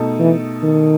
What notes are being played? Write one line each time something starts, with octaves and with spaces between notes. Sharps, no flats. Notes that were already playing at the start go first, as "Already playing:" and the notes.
Already playing: B2 A3 D#4 A4
E3
D#3